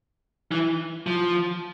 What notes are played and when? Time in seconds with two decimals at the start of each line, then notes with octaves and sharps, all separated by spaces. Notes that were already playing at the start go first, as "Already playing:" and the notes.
0.51 E3
1.07 F3